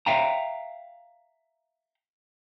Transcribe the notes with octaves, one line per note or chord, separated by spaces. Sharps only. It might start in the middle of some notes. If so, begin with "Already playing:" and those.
E5 F5 G5 A#5